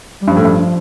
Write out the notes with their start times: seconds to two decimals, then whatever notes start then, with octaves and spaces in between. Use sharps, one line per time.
0.22 G3
0.27 G2 F3
0.36 A2
0.45 G2